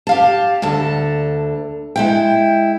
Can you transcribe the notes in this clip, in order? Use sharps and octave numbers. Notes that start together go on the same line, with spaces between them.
G4 F5 A5
D2 D3 A5
G#3 E4 G5